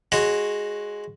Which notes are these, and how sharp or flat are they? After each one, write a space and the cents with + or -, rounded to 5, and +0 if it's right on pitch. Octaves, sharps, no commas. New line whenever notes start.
G#3 +0 F#4 +0 C#5 -25